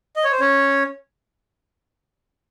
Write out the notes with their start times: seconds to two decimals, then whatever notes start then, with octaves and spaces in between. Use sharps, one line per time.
0.16 D#5
0.24 C#5
0.32 C5
0.40 C#4 C#5